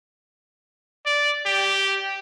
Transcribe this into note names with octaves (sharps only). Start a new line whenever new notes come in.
D5
G4